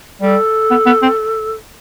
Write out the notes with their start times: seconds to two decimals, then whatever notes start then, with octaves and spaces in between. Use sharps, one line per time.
0.22 G3 A4
0.70 B3
0.86 B3
1.02 C4